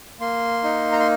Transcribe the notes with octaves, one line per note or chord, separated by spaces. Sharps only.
A#3 C6
D#4
A#5
C6